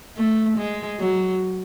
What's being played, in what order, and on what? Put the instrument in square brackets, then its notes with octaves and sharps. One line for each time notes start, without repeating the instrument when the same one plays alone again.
[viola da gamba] A3
G#3
F#3